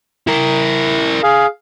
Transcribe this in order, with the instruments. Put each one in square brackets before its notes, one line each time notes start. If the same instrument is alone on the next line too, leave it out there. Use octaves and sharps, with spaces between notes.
[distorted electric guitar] E4 A#4
[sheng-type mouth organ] G#4 F5